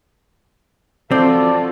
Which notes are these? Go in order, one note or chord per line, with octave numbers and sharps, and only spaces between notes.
F3 C4 F4 F#4 A4 D5